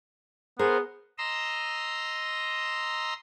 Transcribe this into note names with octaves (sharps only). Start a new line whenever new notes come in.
B3 G#4 A#4 C5
D#5 A#5 C6 E6